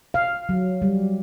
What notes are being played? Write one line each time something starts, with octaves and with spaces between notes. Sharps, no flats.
F5
F#3
G3